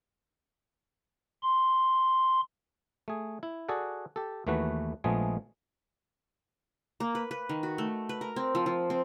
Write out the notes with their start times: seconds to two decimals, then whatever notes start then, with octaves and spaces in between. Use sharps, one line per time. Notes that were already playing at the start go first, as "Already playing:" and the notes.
1.43 C6
3.08 A3 G#4
3.43 E4
3.68 F#4 G#4 A4 D5 F#5
4.16 G4 A4
4.47 D#2 E3 A3 F#4 B4 F#5
5.04 A#1 F3 G#3 A3 B3 G#4
7.00 A#3
7.15 B4
7.31 B4
7.49 D#3
7.63 F#4
7.78 A3
8.09 B4
8.21 A#4
8.36 C4
8.55 F3
8.66 F3
8.90 C4